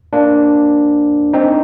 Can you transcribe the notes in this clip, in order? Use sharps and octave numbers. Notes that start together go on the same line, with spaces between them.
A#3 D4
C4 D#4